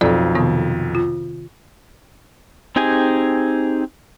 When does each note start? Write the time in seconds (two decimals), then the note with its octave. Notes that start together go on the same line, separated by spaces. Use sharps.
0.01 B1 F2 C4 A4 D5
0.35 C3 D#3 B3
0.95 F4
2.76 C4 D#4 G4 G#4 G#5